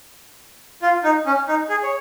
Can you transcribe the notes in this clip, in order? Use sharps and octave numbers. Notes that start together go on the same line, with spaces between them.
F4
D#4
C#4
D#4
G#4
C#5